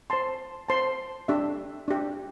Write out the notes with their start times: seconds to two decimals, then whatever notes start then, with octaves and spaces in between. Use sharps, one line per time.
0.10 C5 A5 C6
0.69 C5 A5 C6
1.28 D4 G4 E5
1.88 D4 G4 E5